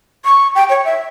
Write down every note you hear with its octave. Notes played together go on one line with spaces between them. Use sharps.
C#6
G5
C#5
E5